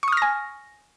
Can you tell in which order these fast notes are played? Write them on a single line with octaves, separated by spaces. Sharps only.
C#6 D#6 F6 A#6 G#5